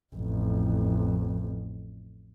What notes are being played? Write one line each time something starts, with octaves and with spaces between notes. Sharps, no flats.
A1 F2